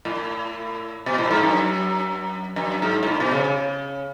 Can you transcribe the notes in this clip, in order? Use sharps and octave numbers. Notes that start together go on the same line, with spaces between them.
A2
B2
A2
G#2
F#2
F#2
G#2
G#2
A2
B2
C#3
C#3